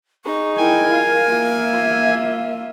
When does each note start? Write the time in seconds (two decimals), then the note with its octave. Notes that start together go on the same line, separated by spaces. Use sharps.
0.25 D#4 G#4 C#6
0.57 E4 A#4 G5 G#5
0.92 F4 F5
1.30 A#3 F4 E5
1.72 F4